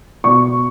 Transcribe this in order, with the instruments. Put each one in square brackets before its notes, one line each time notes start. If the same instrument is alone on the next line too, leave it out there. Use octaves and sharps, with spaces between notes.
[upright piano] B2 C#6